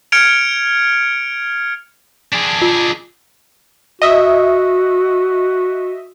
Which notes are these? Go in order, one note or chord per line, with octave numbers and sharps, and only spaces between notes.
F6 G#6 C#7 D7 F7
D4 G#4
F4
F#4 D#5 E5